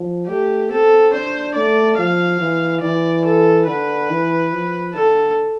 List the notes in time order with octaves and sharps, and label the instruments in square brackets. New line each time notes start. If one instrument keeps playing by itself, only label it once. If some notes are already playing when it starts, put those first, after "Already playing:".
Already playing: [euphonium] F3
[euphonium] A3 [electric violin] G4
[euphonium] C4 [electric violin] A4
[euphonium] D4 [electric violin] C5
[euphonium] A3 [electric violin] D5
[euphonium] F3 [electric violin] F5
[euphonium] E3
[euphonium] E3 [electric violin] D5
[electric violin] A4
[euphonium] D3 [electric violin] B4
[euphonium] E3
F3
[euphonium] D3 [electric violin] A4